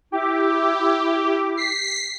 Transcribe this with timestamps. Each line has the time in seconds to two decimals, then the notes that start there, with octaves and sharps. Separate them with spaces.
0.12 E4 G4 D6
1.57 B6 C7